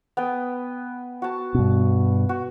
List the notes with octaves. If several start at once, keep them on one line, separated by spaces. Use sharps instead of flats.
B3 G5 D#6
F#4 A5
G2 B2
F#4